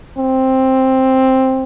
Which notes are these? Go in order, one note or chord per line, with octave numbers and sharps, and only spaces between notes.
C4